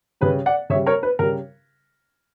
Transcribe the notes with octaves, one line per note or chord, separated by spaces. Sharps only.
C#3 G3 B4
D5 F#5
C#3 G3 C#5 E5
A#4 C#5
B4
C#3 G3 A#4